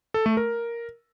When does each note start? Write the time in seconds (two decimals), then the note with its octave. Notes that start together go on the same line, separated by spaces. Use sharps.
0.14 A4
0.26 A3
0.37 A#4